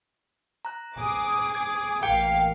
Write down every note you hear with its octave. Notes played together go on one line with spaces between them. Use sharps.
A#5 F#6
G#4 D6 D#6
G#6
A1 A#3 F5 G5 C#7